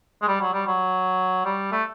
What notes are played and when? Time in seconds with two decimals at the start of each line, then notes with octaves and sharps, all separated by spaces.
0.22 G#3
0.28 G3
0.41 F#3
0.54 G3
0.67 F#3
1.45 G3
1.72 A3